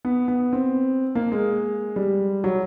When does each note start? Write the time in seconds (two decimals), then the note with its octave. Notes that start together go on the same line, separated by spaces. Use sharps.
0.05 B3
0.28 B3
0.53 C4
1.15 A#3
1.32 G#3
1.96 G3
2.44 F#3